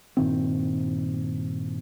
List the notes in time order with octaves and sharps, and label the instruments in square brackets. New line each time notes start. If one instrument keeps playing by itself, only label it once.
[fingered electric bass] G2 A#2 D#3 C4